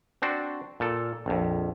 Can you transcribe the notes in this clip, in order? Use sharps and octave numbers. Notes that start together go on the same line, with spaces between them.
C4 D4 F#4 C5
A#2 A4
A#1 F2